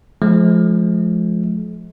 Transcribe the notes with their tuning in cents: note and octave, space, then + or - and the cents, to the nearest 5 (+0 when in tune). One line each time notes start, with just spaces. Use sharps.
F3 +0 G#3 +45